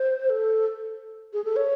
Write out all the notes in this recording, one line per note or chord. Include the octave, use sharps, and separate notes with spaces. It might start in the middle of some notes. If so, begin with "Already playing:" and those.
Already playing: C5
A4
G#4
A4
C#5